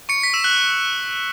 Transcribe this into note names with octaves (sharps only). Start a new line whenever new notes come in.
C#6 C#7
B6
E6 E7
F#6 F#7